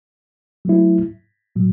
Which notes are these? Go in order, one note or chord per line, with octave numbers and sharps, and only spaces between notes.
F#3 A3 E4
A2 F#3